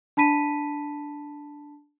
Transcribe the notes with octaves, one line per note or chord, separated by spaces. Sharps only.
D4 A5 B5 B6 D#7